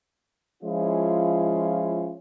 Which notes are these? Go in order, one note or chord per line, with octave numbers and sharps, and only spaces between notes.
F3 G#3 C#4 E4 F4